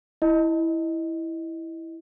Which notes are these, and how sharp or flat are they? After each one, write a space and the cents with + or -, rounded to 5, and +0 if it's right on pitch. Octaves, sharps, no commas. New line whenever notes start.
E4 -5 D#5 +0